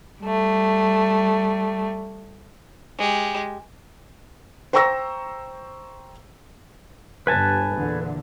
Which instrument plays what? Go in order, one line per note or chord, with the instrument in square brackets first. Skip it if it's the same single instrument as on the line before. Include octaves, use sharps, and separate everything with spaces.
[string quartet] G3 A3
[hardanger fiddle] G#3 G4
[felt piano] C5 G5 A#5 C#6 E6 A#6
[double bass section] G1 [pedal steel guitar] B4 G#5 A5
[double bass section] E2 A#2 D3